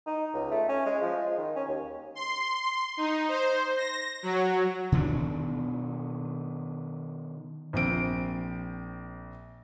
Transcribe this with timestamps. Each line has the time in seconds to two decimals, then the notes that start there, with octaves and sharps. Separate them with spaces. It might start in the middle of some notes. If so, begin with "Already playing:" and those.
0.07 D#4
0.34 C#2
0.51 A3
0.69 C#4
0.86 G#3
1.01 F3
1.17 G#3
1.38 D#3
1.56 C#4
1.68 D#2
2.15 C6
2.97 D#4
3.29 C5
3.77 A#6
4.23 F#3
4.92 B2 D#3 C4 D4
7.73 A#1 C4 D7